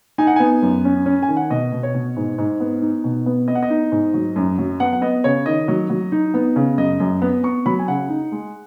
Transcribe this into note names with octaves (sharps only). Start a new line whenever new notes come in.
D#4 G#5
F#5
B3 G#5
F#2
C#4
C#4
G#5
D#3
F#5
B2 D#5
B2
C#5
B2
G#2
G#2
B3
D#4
B2
B3
B3 D#5
F#5
D#5
D#4
G#2
F#3
F#2
F#3
B3 F#5
F#5
B3 D#5
C#3 C#5
D#3 D#5
F#3
F#3
D#4
B3
C#3
F#2 D#5
F#2
B3
B3 C#6
F#3 B5
G#5
C#3 F#5
D#4
G#3